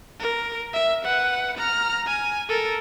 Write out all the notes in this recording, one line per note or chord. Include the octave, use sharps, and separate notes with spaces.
A#4
E5
B4 F#5
A#5 F6
G#5
A4 A#4